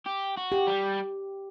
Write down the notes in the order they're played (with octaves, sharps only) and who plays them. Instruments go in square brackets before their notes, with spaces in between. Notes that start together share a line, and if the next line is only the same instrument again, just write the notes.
[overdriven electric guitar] G4
F#4
[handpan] G4
[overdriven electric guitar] G3